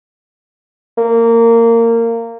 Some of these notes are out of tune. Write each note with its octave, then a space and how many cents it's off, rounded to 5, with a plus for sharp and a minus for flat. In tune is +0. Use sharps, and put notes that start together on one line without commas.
A#3 -20